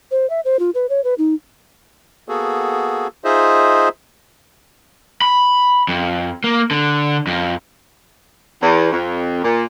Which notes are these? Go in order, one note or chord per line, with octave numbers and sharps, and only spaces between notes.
C5
E5
C5
F4
B4
C#5
B4
D#4
A#3 B3 F#4 G#4 A4
D#4 F4 G#4 C5 D#5 E5
B5
F2
A#3
D3
F2
E2
F2
A#2